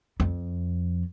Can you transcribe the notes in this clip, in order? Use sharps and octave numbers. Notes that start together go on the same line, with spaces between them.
F2